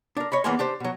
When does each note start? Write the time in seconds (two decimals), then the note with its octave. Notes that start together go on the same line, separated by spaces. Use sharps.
0.17 D4 A#4
0.32 C#5 D#5 B5
0.44 E2 E3 A#3 B3 G#5 C6
0.59 D4 G4 C5
0.80 B2 F#3